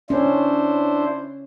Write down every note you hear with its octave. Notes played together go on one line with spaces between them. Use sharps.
C#4 D4 E4 C5